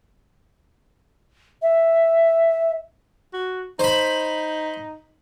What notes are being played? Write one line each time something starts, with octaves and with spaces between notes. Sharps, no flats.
E5
F#4
D#4 C5 B5